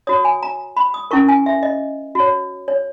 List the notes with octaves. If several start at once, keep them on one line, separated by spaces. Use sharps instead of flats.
F#4 C#5 D#6
G#5
A#5
B5
D#6
C#4 E4 A#4 C#6
G#5
E5
D#5
F#4 C#5
C#5